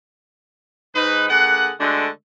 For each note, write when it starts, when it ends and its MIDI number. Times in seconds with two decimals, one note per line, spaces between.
0.95 1.29 44
0.95 1.29 63
0.95 1.29 71
1.29 1.71 50
1.29 1.71 58
1.29 1.71 68
1.29 1.71 78
1.79 2.08 50
1.79 2.08 56
1.79 2.08 57
1.79 2.08 62
1.79 2.08 66